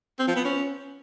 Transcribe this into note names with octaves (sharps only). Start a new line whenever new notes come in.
C4
F3
B3
C#4